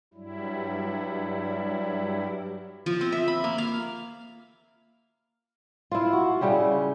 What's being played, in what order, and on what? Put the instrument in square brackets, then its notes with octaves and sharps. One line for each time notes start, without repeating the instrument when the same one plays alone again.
[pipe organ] G2 F#3 G3 E4
[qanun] F3
C4
E5
B5
A#3
F5
[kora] E4 F4
F#4
C#3 G3 E4 G4